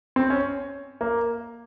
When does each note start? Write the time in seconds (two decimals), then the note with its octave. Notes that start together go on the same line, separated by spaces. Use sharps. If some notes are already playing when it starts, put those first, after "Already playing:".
0.16 C4
0.30 C#4
1.01 A#3